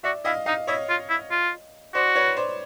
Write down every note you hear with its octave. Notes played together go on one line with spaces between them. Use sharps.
F#4 D5 E5
E4 D#5 F5
D#4 D#5 F5
E4 C#5 D#5
F4
E4
F4
F#4 C5 D5
B4 C#5
C5 D5